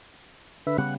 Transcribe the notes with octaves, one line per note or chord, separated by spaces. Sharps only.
D3 B4 E5
C#3 G3 B3 F#5